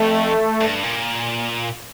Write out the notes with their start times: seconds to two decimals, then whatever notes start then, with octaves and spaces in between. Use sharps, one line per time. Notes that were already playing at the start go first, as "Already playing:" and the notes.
Already playing: F2 A3
0.61 G2
0.84 A#2